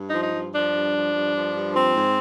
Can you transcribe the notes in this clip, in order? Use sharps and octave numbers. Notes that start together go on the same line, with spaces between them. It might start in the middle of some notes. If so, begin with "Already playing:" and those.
Already playing: G2
F3 D#4
D#4
G2
F3 D4
G2
F3
G2
F3
G2
F3 C4
G#2